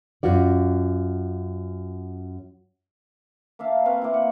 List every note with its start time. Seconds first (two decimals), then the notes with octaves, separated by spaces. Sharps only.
0.23 F#2 F4 F#4 D5
3.59 A#3 E5 F5 A5
3.85 C4 B4 F5 C#6
4.02 A#3 E4
4.14 F#5